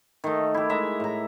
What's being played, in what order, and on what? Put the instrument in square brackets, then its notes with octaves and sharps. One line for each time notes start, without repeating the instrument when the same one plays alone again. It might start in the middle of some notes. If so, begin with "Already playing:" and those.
[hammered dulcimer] D#3 A3
E4 G4
G#3 E5 A#5
A2 A#5